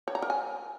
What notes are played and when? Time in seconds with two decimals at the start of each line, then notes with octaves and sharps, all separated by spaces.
0.08 C#5
0.15 A#5
0.22 A#4
0.30 G#5